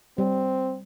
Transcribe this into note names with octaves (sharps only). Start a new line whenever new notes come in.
G3 C4